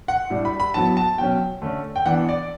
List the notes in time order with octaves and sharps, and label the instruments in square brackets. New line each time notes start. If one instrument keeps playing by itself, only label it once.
[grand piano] F#5
A2 G3 D4
B5
B5
A2 F#3 B3 A5
A5
B2 F#3 C#4 G5
D3 A3 C#4
G5
E3 B3 D4 F#5
D5